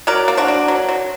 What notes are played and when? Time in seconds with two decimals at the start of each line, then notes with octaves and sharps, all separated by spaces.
0.07 F#3 A#4 D5
0.28 A#3
0.37 D4 F#4
0.48 D4
0.68 F#3
0.89 F#3